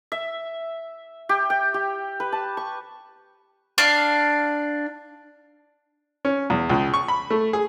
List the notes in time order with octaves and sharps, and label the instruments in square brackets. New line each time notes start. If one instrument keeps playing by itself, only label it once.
[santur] E5
G4
G5
G4
B4
A5
C#6
[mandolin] D4 F5
[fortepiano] C#4
E2
C#2
C#6
B5
A3
G#4